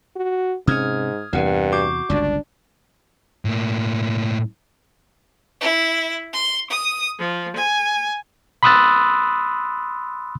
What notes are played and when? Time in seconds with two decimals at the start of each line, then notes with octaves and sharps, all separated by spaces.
0.16 F#4
0.67 G#2 C3 C#4 D#6 F6 G#6
1.33 E2 G2 C3 E3 A#4 F#5
1.72 F#4 D6 G6
2.10 G1 C#2 G2 D4
3.45 A2 A#3
5.60 E4
6.32 C6
6.70 D#6
7.19 F3
7.55 G#5
8.63 B5 C6 D#6 E6 F#6 A6